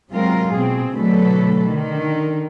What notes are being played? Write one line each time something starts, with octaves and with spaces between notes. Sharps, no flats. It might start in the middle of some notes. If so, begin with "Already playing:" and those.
C3 F#3 G#3 C4 F4 A#4
B2 C4 G#4
B2 D3 F#3 A3 A4 B4
D3 D#3